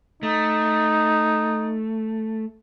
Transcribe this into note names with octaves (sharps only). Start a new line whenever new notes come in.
A3 D#4